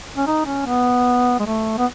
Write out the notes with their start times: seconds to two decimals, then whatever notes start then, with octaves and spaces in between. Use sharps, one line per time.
0.17 C#4
0.27 D#4
0.46 C#4
0.66 B3
1.40 G#3
1.46 A3
1.78 B3